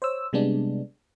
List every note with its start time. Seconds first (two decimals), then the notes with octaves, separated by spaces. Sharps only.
0.02 C5 C#5 E6
0.33 C3 G3 G#3 B3 D4